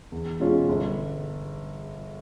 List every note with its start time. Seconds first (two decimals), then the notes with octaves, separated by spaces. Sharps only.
0.12 E2
0.40 B2 G#3 C#4 F4
0.69 G1